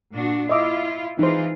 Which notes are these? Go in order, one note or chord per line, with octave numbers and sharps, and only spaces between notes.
A#2 D4 F#4
E4 F4 D#5 E5 D6
E3 D#4 F4 G#4 C5